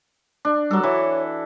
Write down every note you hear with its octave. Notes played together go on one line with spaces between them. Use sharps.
D4
F#3 G3 A4
E3 C#5